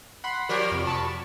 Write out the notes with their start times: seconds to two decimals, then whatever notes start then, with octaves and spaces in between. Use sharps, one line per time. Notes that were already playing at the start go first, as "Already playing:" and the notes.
0.24 F#5 B5 C6
0.49 F3 G4 A#4
0.72 F2 C3
0.87 A5 B5 C#6